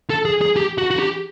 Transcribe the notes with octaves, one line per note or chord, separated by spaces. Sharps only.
A4
G#4
G#4
G4
F#4
F#4
G4